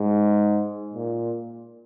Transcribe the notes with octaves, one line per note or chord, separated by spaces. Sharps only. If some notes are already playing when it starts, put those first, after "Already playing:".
Already playing: G#2
A#2